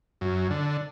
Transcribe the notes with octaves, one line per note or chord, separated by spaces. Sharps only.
F#2
D3